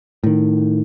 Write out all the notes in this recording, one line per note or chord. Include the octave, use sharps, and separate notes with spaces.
A2 D#3